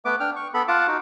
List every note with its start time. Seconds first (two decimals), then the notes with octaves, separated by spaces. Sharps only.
0.05 A3 B3 B4 D6
0.20 D4 G5 F6
0.36 C#6
0.54 B3 A4 B5
0.68 F4 F5 F#5 A5 D6
0.87 D#4 F#4